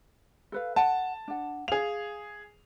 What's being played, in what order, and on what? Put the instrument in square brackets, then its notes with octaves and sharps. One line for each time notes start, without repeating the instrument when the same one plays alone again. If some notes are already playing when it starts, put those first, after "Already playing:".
[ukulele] A4 B4 F5
[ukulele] F#5 [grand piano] A5
[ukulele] D4 F#5
[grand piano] G#4 F7 [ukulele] F5